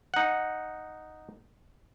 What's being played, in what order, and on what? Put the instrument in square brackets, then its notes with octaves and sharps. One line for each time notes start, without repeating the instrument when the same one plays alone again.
[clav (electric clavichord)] D#4 F#5